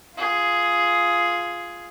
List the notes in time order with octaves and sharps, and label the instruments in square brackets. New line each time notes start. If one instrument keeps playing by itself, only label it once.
[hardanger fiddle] F4 G#4